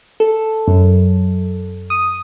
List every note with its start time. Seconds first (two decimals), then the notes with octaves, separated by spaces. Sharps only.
0.20 A4
0.68 F#2
1.90 D#6